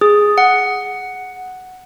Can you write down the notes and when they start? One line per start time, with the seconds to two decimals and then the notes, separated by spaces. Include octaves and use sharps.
0.01 G#4
0.38 F#5